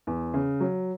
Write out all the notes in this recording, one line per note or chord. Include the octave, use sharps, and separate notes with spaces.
E2
C#3
F#3